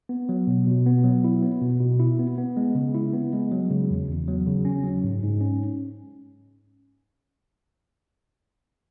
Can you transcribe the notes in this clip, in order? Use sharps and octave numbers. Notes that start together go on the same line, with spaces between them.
B3
F#3
B2
B2
B3
F#3
E4
B3
B2
B2
E4
B3
B3
G#3
C#3
E4
B3
G#3
F#3
C#3
E2
E2
F#3
C#3
C#4
F#3
G#2
G#2
C#4